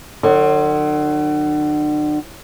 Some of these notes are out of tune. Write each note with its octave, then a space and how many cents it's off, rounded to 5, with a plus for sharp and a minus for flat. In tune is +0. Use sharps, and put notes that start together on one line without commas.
D3 +40 F#3 -10